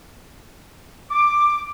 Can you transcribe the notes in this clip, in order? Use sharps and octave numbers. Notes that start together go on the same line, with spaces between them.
D6